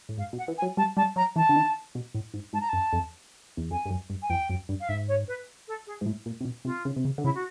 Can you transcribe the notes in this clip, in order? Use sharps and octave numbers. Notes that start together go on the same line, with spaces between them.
A2
G#2 F5
B2
F#5
E3
G#5
F#3
G3 A5
G3 A5
F#3 A#5
E3 A5
D3
D#3
B2
A2
G#2
G#2 A5
A#5
F#2 A5
F2
E2
F2 G#5
G2
F#2
G2
G#5
F2 G5
F#2
G2
F5
G#2 E5
C#5
B4
A4
G#4
G#2
A2
A#2
C3
B2
C3 F4
C#3
C3
C#3
D3
C#3 E4
F#4